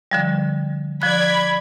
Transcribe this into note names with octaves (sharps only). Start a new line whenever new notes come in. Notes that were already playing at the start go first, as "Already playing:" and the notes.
D3 F3 G3
F3 D5 B5 F#6 G#6